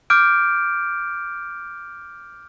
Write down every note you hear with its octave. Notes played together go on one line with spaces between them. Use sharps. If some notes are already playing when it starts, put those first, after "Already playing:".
D6 F6 G6 D7